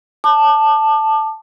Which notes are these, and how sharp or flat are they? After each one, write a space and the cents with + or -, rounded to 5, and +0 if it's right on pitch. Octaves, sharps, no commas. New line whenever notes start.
A5 +0 D6 +35